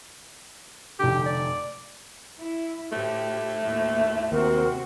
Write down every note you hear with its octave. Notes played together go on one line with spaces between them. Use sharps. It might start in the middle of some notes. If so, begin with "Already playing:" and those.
F1 D3 G4
D5
E4
A2 A3 G4
D#2 A2 E5
D#2 C3 C4 F#4 A#4